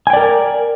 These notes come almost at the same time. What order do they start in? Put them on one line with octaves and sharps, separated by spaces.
G#5 G5 D5 A#4